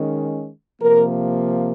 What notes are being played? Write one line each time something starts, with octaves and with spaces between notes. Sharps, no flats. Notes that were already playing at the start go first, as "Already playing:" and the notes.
Already playing: D#3 G#3 C#4
C3 F3 A#3 A#4